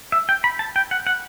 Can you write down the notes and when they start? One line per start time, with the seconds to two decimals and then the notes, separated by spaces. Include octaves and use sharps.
0.12 E5
0.29 G5
0.44 B5
0.59 A5
0.76 G5
0.91 F#5
1.07 F#5